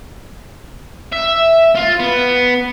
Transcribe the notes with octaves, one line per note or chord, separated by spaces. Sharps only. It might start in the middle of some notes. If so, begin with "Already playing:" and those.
E5
F4
B3